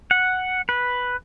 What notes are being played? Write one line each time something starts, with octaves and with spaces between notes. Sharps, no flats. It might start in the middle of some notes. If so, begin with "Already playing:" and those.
F#5
B4